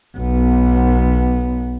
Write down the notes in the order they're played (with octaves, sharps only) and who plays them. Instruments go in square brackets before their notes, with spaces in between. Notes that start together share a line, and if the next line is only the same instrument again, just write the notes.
[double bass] B1 B3